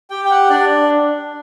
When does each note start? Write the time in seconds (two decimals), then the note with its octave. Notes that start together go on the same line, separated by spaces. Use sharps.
0.10 G4 G5
0.25 G5
0.31 F#5
0.50 D4 D5